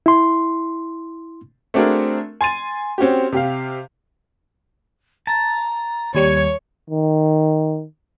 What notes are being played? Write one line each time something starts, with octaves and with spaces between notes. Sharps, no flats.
E4 C6
A3 C4 D4 F#4 G#4 A#4
G#5 C6 A6 D#7
C4 C#4 F#4 G4
C3 G4 F5
A5 A#5
D#2 G3 C#5 G#6 C#7
D#3